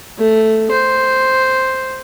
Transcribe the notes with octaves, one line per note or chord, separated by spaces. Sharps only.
A3
C5